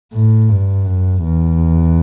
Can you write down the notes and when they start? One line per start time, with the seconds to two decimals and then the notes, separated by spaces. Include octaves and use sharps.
0.13 A2
0.49 G2
0.86 F#2
1.23 E2